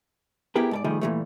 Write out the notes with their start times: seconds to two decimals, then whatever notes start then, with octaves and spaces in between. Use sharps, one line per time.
0.56 B3 E4 G4 G#4 A#4
0.71 G#2 A4 D5
0.84 A2 D#3 F3 G3 A3 G#4
1.01 A#2 D#3 E3 G3 A3